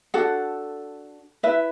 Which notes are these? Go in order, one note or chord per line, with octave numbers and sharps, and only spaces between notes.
D4 F#4 A4 F#5
E4 B4 E5